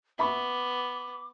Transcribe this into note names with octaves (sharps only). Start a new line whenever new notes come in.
B3 E5 B5 C#6 D6